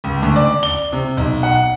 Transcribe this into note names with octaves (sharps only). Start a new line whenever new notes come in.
C#2
D2
D5
G7
C3
B1
F#5